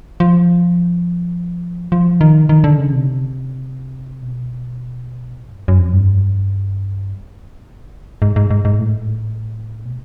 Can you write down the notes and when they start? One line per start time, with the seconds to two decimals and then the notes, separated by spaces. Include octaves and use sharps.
0.20 F3
1.92 F3
2.21 D#3
2.49 D#3
2.64 D3
2.78 C#3
2.93 C3
4.21 B2
5.35 A2
5.50 G2
5.68 F#2
5.79 F2
5.93 G2
8.22 G#2
8.36 G#2
8.51 G#2
8.65 G#2
8.79 A2
9.85 B2